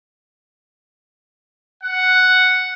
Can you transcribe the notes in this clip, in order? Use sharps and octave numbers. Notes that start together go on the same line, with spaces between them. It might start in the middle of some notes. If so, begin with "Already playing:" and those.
F#5